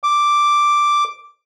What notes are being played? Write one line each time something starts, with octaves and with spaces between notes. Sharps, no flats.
D6